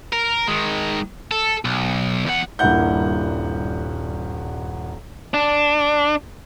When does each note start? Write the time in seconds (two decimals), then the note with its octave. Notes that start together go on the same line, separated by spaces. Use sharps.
0.12 A#4
0.48 D#3 G#3
1.31 A4
1.65 B1
2.26 E2 F#5
2.59 D#1 G2 A#3 E4 F#5 G6
5.34 D4